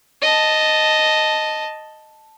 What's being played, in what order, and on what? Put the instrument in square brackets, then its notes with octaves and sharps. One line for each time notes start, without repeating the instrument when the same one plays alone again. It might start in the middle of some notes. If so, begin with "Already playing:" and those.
[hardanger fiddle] D#5 A5